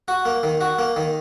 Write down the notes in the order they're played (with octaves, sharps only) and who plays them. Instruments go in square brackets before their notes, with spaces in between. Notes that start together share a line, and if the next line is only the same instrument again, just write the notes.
[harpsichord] F#4
A#3
D#3
F#4
A#3
D#3